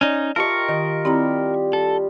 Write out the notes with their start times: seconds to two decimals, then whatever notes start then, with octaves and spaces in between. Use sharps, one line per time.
0.01 C#4 D#4 D5
0.36 F4 G4 A#4 D#5 A5 C#6
0.69 D#3 D#5
1.05 G3 C4 E4 A#5
1.73 A4